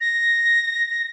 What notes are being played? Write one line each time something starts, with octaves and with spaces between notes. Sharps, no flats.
A#6